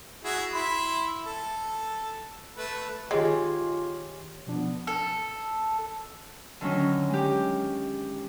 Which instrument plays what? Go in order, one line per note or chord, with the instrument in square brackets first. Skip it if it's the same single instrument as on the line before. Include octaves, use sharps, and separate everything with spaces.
[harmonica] E4 F#4 G#4
E4 B5 C6
A4
A3 B4
[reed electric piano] D#3 G#5 [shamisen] G#3 [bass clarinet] F4 [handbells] G4 C#5
[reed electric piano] B2 F3 D4 [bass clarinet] B3
[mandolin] A4
[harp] D3 D#3 F#3 C#4
G#3 G4